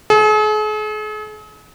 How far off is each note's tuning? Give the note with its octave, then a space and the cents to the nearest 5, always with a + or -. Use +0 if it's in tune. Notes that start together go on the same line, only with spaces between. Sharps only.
G#4 +45